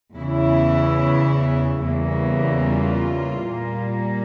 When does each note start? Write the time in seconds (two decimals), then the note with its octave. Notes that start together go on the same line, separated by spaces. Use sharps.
0.15 E2 C#3 E3 E4
1.80 E2 C#3 E3 G3 A#3
2.61 F4
3.43 A#2 G3 A#3